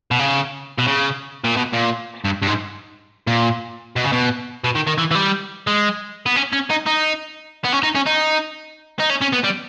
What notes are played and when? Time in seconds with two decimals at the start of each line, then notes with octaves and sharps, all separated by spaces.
0.11 B2
0.19 C#3
0.79 B2
0.88 C#3
1.44 A#2
1.56 B2
1.73 A#2
2.25 G2
2.42 G2
2.47 G#2
3.27 A#2
3.96 B2
4.04 C#3
4.12 B2
4.64 B2
4.75 D#3
4.87 D#3
4.98 E3
5.11 E3
5.15 G3
5.67 G#3
6.26 B3
6.36 C#4
6.53 C#4
6.70 D#4
6.86 D#4
7.65 B3
7.73 C#4
7.83 D#4
7.95 C#4
8.07 D#4
8.99 D#4
9.10 C#4
9.21 C#4
9.33 B3
9.44 G3